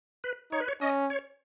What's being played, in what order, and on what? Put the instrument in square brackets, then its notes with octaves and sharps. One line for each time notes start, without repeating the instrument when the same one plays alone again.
[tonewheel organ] B4
[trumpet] D#4 [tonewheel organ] C#5
[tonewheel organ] B4
C#5
[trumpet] C#4 [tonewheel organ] D#5
[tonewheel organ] C#5